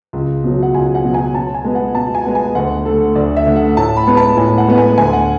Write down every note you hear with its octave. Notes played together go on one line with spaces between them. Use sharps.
C#2
B2 F#3
F#5
C#2 G#5
F#5
B2 F#3
G#5
B2 A5
G#5
G#3 B3
F#5
B2 A5
G#5
G#3 B3
G#5
D2 F#5
D3 A3 A4
D2 D5
E5
D3 A3
F#5
A2 A5
B5
G#3 B3
A5
A2 G#5
F#5
G#3 B3
G#5
D2 G#5
F#5